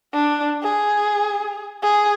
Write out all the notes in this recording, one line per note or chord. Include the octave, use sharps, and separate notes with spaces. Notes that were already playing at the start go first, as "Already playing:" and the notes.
D4
G#4
G#4